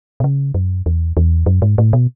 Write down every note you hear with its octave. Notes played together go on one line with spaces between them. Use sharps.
B2
C#3
F#2
E2
E2
F#2
G#2
A2
B2